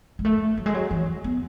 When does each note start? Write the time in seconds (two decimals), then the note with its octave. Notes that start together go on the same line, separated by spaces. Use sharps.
0.19 G#3
0.25 A3
0.57 F#3
0.66 G#3
0.74 F#3
0.91 E3
1.24 B3